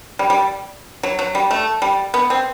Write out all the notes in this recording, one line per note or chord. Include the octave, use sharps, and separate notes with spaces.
G3
G3
F#3
F#3
G3
A3
G3
B3
C4